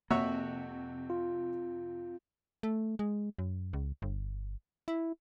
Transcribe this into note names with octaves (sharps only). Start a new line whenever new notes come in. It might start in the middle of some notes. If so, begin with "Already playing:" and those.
F2 C3 A#3 F#4 C#5 E5
F4
A3
G#3
F#2
C#2
G1
E4